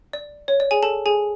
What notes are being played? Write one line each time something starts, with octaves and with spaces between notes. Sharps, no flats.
D5
C#5
D5
G#4 G#5
A4 A5
G#4 G#5